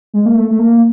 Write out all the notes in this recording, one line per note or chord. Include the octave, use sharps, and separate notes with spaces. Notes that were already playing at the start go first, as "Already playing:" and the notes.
G#3
A#3
A3
A3
A#3